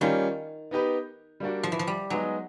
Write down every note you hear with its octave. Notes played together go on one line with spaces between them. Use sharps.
D#3 G3 A#3 C#4 F4
B3 D#4 G4 B4
G3 A#3 D4 F#4
F3
E3
F3
G3
F#3 G#3 B3 D#4 G#4